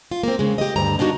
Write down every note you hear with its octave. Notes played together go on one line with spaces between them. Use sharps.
F4
A#3 C4
C#3 G#3
G4 D#5
D2 G2 D4 A#5
A#3 D4 D#4 F#4